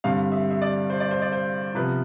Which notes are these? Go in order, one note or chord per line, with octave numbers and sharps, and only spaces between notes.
G2 D3 G3 C4 F5
E5
E5
D5
C5
D5
C5
D5
C5
C3 F3 B3 B4